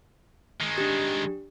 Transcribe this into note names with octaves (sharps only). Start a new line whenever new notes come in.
D#3 G#3
D4 G4